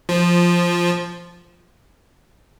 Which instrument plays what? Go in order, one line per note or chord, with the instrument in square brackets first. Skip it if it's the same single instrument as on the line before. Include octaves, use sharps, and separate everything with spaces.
[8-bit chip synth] F3